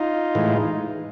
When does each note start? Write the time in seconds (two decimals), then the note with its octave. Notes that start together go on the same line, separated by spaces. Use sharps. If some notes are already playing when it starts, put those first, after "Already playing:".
Already playing: D#4 F4
0.35 A2 E3 G#3